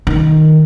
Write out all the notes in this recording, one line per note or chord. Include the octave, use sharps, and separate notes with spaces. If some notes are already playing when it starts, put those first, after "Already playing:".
D#3